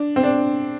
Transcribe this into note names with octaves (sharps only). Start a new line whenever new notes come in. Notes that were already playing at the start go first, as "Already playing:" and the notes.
Already playing: D4
C4
D4